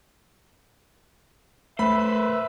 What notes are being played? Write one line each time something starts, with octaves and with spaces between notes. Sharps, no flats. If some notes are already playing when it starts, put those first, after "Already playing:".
A3 B4 C5 E5 B5